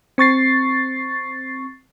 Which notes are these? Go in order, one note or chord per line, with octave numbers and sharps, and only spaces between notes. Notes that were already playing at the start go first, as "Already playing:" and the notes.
C4 C#6 A6 C7